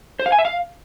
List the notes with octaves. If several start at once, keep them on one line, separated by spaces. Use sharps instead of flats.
C5
F5
G#5
E5
F5